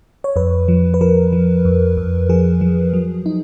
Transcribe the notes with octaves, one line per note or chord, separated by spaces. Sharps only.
C#5
F2 B4
F3
B4
F3 A#4
F3
F2
F2
F3 G#4
F3
F#3
D#4